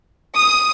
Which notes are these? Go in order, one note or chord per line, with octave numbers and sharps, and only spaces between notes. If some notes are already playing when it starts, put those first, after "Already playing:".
D#6